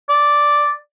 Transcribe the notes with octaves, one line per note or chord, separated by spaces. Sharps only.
D5